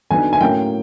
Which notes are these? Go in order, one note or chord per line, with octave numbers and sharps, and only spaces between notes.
D3 F#3 B3 D#4 G#5
G#5
A2 F#3 A#3 C#4 G5